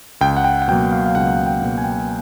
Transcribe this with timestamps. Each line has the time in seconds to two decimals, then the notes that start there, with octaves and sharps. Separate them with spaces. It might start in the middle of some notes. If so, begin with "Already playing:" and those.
0.21 C#2 G5
0.37 F#5
0.44 G5
0.62 F#5
0.68 B2 F#3 A#3 G5
0.92 F5
1.06 F5
1.15 C#2 F#5
1.47 G5
1.62 B2 F#3 A#3
1.78 G#5
1.84 G5
1.92 G#5